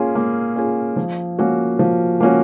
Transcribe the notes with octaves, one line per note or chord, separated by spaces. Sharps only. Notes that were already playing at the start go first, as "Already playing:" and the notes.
Already playing: A#3 C#4 F4 G#4
A#3
C#4 F4 G#4
F3
A#3 C#4 F#4
F3
A#3 C#4 F#4